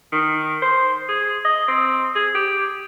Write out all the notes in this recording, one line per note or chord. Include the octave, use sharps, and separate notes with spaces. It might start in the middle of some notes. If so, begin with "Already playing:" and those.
D#3
C5
G#4
D#5
C4
G#4
G4